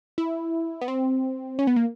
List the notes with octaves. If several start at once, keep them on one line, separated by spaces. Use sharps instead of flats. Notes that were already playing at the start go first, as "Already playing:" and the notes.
E4
B3
C4
C#4
B3
A#3